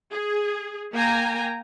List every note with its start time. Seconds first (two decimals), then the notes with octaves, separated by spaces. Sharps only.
0.12 G#4
0.92 A#3 G5 G#5 A#5